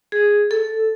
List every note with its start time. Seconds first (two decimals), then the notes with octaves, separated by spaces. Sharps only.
0.12 G#4
0.51 A4